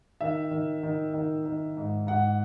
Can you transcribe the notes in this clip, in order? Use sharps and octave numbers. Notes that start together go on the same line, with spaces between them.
D#3 E5
D#3
D#3
D#3
D#3
G#2
G#2 F#5